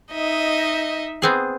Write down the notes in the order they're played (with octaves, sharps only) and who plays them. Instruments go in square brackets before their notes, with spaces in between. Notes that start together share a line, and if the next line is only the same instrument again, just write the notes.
[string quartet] D#4 D#5 E5
[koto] B3 C4 G#4